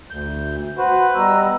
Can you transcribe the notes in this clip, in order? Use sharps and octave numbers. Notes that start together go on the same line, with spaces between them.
D2 G6
F#4 B4 C5
G3 B3 D#5 A#5 E6